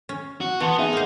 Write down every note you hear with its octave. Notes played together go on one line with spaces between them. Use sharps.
C#4
F#4
E3 B3 F#5 A5 C6
D#4 G#4 E5 F#5
A#3 C5